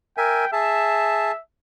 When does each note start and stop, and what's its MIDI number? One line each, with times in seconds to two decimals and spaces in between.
0.17 0.45 70
0.17 0.45 76
0.17 0.52 79
0.17 0.45 80
0.53 1.32 68
0.53 1.40 76
0.53 1.32 81